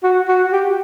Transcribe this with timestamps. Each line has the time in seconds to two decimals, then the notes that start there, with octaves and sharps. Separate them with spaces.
0.03 F#4
0.28 F#4
0.52 G4